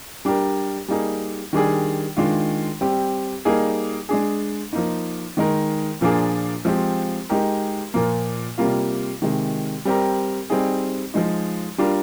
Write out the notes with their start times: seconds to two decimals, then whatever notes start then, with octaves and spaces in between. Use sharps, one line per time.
0.25 G3 D4 G4 A#4
0.88 G3 A#3 D#4 G#4
1.53 D#3 G3 D4 G#4
2.17 D#3 G#3 D4 F4
2.81 G3 C4 G4
3.45 G3 A#3 D#4 G#4
4.09 G#3 D4 G#4
4.73 F3 A#3 D#4
5.37 D#3 G#3 D#4 A#4
6.01 A#2 F3 A#3 D4 G#4
6.65 F3 G#3 C4 G4
7.29 G#3 D#4 G4 A#4
7.94 A#2 F3 A#3
8.58 C3 G3 A#3 F4
9.22 C3 D#3 G#3
9.85 G3 C4 G4 A#4
10.50 G3 C4 D#4 G#4
11.14 F3 G#3 D#4
11.78 G3 D4 F4 A#4